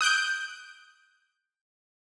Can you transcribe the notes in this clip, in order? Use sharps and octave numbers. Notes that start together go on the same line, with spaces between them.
D#6 F#6 G6 D7